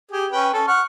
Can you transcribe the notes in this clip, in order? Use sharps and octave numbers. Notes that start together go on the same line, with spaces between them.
G4 G#4
C#4 B4 G5
C#4 A4
F#5 C#6 F6